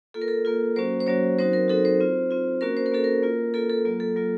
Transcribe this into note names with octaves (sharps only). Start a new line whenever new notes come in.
A#3 F4 A4
A#4
A4
A#3 F4 A#4
F#3 A#3 C#4 F#4 C5
C5
F#3 A#3 C#4 F#4 C#5
F#3 C4 D#4 F#4 C5
A#4
F#3 C4 D#4 F#4 A4
C5
C4 F4
C4 F4
A#3 C#4 F#4 A#4
C5
A#4
A#3 C#4 F#4 A4
A#4
A#3 F4
A#3 F4 A4
A4
F#3 A#3 F4
A4
F#3 A#3 F4